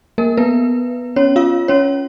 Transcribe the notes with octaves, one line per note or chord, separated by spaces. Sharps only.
A#3 A#4
B3 B4
C#4 C#5
F4 F5
C#4 C#5